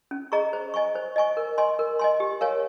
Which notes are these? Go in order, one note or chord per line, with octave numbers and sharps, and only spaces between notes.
C#4
G#4 D#5 A#5 C#6
C5
D#5 G#5 C#6
C5
D#5 G#5 C#6
A#4
D#5 G#5 C6
A#4
D#5 G#5 C6
G4
A#4 C#5 F5 G#5